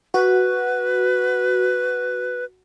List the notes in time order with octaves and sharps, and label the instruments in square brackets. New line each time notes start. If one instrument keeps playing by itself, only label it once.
[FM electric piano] F#4 [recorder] B4